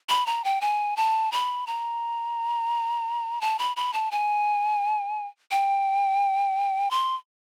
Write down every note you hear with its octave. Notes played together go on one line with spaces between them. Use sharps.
B5
A#5
G5
G#5
A5
B5
A#5
A5
B5
B5
A5
G#5
G5
C6